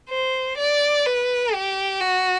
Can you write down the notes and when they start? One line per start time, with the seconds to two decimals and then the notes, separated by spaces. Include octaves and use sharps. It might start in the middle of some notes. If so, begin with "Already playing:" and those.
0.10 C5
0.58 D5
1.06 B4
1.54 G4
2.01 F#4